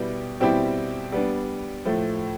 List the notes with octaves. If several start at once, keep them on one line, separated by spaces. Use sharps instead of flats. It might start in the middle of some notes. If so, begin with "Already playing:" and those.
Already playing: B2 G3 B3 E4 G4
B2 G3 C4 E4 G4
G3 B3 D4
A2 F3 A3